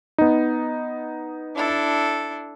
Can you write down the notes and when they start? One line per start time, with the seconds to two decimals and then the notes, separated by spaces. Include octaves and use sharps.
0.18 B3 D#4
1.54 D4 E4 A4